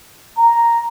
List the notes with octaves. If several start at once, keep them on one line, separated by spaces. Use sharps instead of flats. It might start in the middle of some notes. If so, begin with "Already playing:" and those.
A#5